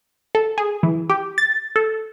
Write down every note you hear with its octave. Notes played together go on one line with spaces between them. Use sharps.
A4
G#4
E3
G4
A6
A4